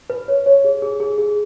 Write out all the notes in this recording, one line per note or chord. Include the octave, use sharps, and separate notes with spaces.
B4
C#5
C#5
G#4
G#4
G#4
G#4